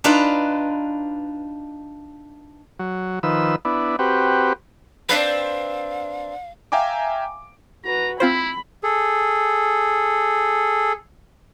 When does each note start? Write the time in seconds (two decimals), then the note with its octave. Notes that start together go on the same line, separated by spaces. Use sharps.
0.04 D4 D#4 F4 B4
2.79 F#3
3.23 D#3 F3 B4 E6
3.65 B3 D4 E4
3.99 C4 F#4 G4 B4
5.09 C4 D4 B4 F5
6.72 E5 F5 G5 G#5 A#5 D6
7.84 F#4 B4 A#5
8.20 C4 E4 F4 C5 B5
8.83 G#4 A4